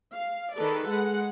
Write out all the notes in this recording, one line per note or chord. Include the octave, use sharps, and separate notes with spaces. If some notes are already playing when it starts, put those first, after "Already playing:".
F5
D#3 G#4 A4 B4 D5
G#3 F#5